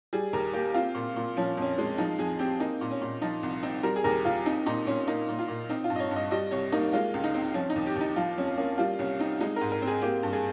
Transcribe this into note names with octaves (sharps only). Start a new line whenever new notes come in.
G3 G#4
D#2 A#4
A#3 G4
C4 F4
A#2
A#2
F3 C#4
F2 C#4
G#3
F3 D#4
F2 G#4
C4 G4
A#3 D#4
A#2
C#4
A#2
F3 D#4
C2
C4 D#4
G3 A#4
G#4
D#2 A#4
D#2 F4
C4 D#4
A#2 D#4
A#2 C#4
A#3 D#4
A#2
F4
A#2
C4 D#4
F4
G2
D#5
C#5
G2
D#5
G3 D#5
C2 C#5
A#3 D#4
G#3 F4
C#2
D#4
C4
F3 C#4
D#4
D#2
G4
D#2
D#4
F3 F4
F2 C#4
A#3 C#4
G3 F4
C2 C#4
C4 D#4
G#3 D#4
A#4
G#2
A#4
C4
G#4
A#3 G4
G2
G#4